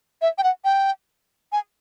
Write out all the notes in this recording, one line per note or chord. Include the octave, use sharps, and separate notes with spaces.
E5
G5
F#5
G5
G#5